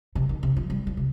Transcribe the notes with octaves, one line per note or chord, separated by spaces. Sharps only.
C3
D#3
C3
F3
G3
F3
C3